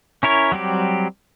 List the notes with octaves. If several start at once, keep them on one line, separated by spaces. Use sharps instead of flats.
C#4 E4 A#4 C#5
F#3 G3 C4 G4